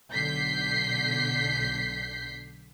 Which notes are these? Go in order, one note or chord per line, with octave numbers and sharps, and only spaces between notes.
B1 D3 G6 B6 C7